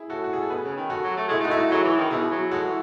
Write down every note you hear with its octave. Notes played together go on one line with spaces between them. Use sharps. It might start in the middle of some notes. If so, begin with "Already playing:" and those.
Already playing: E4 G#4
A2 F#4 A4
F#4
G#4
A4
B2 G#4 B4
C#3
D#3
F#4 A4
F#3
A3
G#3 E4 G#4
A3 D#4 F#4
E4
D#4 F#4
F#3 E4 G#4
E3
D#3
B2 E4 G#4
F#3
G#3 F#4 A4
E3